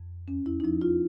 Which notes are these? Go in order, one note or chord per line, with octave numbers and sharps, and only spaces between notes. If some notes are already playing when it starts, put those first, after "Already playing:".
Already playing: F2
E2 C#4
E4
D#4
F3 E4
F4